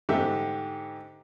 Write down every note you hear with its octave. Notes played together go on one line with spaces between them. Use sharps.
G#2 D3 G4 E5